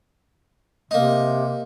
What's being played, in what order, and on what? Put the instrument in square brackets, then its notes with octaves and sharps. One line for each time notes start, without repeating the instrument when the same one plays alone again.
[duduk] C3 [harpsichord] A#3 D#4